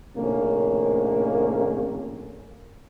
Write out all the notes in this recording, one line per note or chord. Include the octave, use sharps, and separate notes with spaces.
A#1 A2 C3 D#3 A#3 C#4